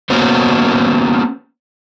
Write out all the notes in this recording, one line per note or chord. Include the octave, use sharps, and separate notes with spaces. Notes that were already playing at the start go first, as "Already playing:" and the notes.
A#3 B3 C#4 F#4 C5